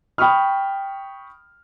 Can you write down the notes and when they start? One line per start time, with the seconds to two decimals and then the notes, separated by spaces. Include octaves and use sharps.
0.18 G5 B5 C#6 D#6 F6